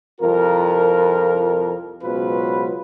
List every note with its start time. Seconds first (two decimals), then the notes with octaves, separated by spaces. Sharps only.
0.20 C2 F2 F4 A#4
2.02 C#2 B2 F#3 F4 B4 C5